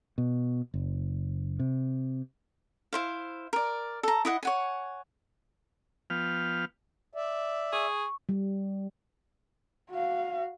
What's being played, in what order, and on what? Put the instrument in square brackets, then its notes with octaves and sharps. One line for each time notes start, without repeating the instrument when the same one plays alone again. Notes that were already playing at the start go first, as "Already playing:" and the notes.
[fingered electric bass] B2
F#1
C3
[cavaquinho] E4 C5 F5
A#4 D5
A4 A#5
E4 D#5 F#5
C#5 F#5 G#5
[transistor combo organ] F3 B3 F5 G5 F6
[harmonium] D5 E5
[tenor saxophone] G#4 [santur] C#6
[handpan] G3
[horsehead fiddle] F#4 F5